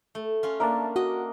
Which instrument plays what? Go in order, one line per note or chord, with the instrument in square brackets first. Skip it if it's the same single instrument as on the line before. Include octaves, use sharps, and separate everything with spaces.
[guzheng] A3
C#4 F4
[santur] A#3 D4 A#4 [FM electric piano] E5 A5
[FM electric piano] F#4 [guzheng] D#5